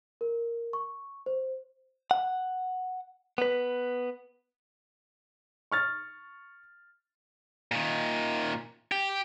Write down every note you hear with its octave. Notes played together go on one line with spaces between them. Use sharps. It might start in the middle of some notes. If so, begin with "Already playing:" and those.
A#4
C#6
C5
F#5
B3 B4
C#6 F6 A6
A#2 D#3
G4